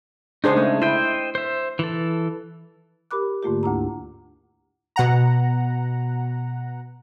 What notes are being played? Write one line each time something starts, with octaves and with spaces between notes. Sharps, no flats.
C#3 G#3 D4 D#4 G#4 C5
A3
E4 C5 D#5 G5
C5 E5
E3 A4
G4 A#4 B5 D6 F#6
G#2 D3 A3 A#3 F4 G4
D2 D4 E4 A#5
B2 F#5 A#5